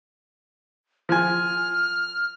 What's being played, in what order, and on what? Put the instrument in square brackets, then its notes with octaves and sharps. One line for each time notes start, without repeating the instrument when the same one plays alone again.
[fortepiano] F3 G#5 [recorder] F6